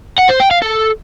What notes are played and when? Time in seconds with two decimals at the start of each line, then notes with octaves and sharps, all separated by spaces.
0.18 F#5
0.29 C5
0.40 G5
0.51 F5
0.62 A4